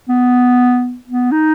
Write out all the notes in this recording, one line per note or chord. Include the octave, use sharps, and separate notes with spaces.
B3
B3
D#4